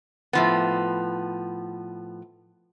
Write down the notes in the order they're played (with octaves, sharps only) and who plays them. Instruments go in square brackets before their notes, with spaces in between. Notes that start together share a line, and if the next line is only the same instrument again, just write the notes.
[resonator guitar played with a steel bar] A2 F3 B3